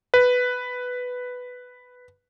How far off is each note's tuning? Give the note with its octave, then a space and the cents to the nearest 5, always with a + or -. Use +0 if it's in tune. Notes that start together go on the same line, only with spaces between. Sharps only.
B4 +5